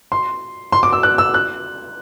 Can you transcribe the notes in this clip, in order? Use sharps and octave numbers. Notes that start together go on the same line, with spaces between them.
C6
C6
D6
E6
F#6
E6
F#6